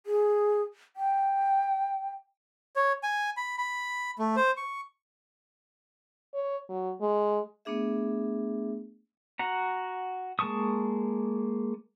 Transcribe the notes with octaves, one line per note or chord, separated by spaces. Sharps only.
G#4
G5
C#5
G#5
B5
B5
A3
C5
C#6
C#5
F#3
G#3
A3 B3 D4 G#4 E5
F#4 F#5 A#5
G#3 A#3 A5 C#6 D#6